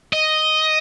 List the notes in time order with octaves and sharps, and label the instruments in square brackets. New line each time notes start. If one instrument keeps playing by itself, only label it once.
[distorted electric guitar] D#5